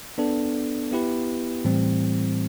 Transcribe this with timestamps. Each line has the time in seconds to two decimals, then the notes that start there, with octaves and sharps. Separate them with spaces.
0.18 B3 D4 A4
0.91 B3 E4 G4 B4
1.65 A2 E3 G3 C4